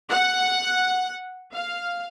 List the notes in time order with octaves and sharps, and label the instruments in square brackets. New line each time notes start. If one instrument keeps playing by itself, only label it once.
[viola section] F#5
F5